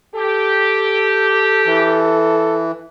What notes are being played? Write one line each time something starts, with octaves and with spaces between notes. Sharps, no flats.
G4 A4
E3